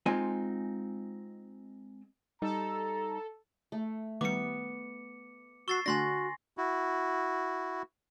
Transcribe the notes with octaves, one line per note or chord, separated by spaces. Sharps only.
G#3 C4 D#4 F4 G#5
G3 D#4 A4 A#5
A3
D#3 G3 B3 D6 C#7
F#4 C#6 E6 A6 C7
D3 A3 D4 F#4 G#5 C6 A#6
E4 F#4